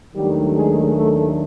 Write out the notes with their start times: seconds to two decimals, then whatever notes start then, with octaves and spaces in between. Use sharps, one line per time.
0.15 D#2 D#3 F#3 G3 A3 D4 G4
0.56 G#3 G#4
0.96 A3 A4